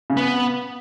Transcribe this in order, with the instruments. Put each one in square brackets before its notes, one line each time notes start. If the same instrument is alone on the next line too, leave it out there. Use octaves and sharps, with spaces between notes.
[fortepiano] C#3
[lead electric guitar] B3